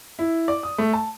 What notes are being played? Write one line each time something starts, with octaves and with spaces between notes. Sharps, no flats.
E4
D5
D#6
A3
A5